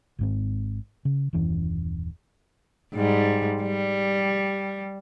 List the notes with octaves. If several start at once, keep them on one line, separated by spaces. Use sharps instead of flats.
G#1 G#2 C4
C#3
D#1 F#2 E3 C#4
G#2 G3
G3